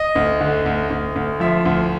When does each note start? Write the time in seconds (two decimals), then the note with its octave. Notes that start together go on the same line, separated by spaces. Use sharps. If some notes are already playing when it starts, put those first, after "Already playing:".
Already playing: D#5
0.15 D2
0.41 D3
0.66 D2
0.90 D2
1.16 D2
1.40 F3 E5
1.65 D2